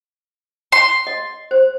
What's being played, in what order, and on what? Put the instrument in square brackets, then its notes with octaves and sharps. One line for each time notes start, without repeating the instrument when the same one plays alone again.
[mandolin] C6
[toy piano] D#5
C5